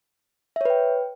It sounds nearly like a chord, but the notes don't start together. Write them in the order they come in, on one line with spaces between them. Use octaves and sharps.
E5 C#5 B4 G5